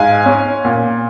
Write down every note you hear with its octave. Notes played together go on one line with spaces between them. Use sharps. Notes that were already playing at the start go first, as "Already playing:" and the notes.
Already playing: G#2 F5 G#5
C#4
A#2